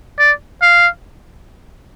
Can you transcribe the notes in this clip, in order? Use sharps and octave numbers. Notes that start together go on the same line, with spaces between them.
D5
F5